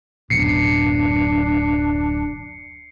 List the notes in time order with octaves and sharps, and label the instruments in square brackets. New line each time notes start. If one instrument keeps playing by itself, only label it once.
[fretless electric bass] D1 F#2 B2 [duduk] D4 [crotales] C7 C#7